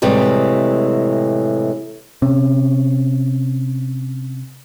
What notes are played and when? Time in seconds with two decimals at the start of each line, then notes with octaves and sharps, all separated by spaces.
0.02 A2 C3 E3 G3 G#3
2.22 C3 C#4